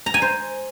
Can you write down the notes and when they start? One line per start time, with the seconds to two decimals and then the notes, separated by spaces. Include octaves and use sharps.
0.06 A#5
0.14 G#5
0.22 C5